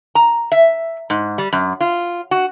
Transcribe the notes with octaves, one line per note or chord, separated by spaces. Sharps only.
A#5
E5
G#2
G3
F#2
F4
F#4